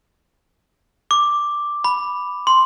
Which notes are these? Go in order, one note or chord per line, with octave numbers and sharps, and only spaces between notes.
D6
B5
C6